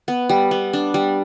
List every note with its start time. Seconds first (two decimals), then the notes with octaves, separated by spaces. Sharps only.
0.08 B3
0.29 G3
0.51 B3
0.73 D4
0.94 G3